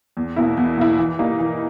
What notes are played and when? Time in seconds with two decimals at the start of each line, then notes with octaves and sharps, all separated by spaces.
0.17 E2
0.36 B2 A#3 E4
0.57 E2
0.78 B2 A#3 E4
0.99 E3
1.19 G3 A#3 D#4
1.40 E3